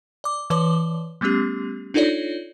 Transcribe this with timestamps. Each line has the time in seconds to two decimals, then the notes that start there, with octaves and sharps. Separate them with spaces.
0.24 D5 D6
0.50 E3 B4 C#5 D5 D6 G7
1.21 G3 A3 B3 C#4 G4
1.94 D4 D#4 F4 A4 C#5 D5